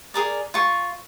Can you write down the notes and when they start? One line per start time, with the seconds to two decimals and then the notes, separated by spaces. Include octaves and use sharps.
0.14 G#4 A#4 D5
0.54 F4 C#6